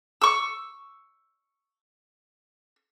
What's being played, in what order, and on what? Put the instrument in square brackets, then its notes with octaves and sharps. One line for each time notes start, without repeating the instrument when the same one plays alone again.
[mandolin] C#6 E6